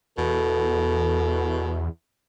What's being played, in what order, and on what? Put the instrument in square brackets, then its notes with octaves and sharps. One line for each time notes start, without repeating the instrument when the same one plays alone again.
[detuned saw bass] E2 [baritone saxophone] B2 [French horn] A4